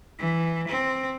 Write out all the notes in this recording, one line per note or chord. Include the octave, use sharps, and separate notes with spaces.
E3
C4